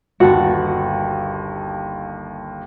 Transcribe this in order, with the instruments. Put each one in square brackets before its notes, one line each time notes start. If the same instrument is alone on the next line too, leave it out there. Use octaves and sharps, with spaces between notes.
[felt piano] G1 D#2 A5 [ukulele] F#4